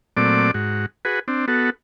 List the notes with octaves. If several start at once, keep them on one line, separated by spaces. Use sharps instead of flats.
A#2 F#3 A3 C4 D5 D6
G#2 F#4
F#4 G#4 B4
C4 D4
B3 F#4 A4